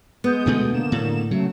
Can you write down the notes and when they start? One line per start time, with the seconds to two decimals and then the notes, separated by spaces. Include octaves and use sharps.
0.24 G#3 B3 D#6 G6
0.46 D2 B2 A3
0.70 D3 A#3 E7
0.92 A2
1.31 C#3 F#3 A3